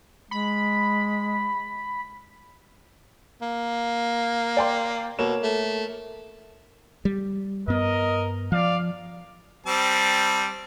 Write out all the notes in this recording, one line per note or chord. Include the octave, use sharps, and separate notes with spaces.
G#3 B5
A#3
D5 G5 C6
B2 A#3 C#5 E7
A3
G3
G2 B3 A#4 D#5
F3 D5 F5
G3 C4 A5